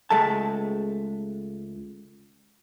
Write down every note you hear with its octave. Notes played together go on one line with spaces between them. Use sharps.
C#2 G#3 A3 A5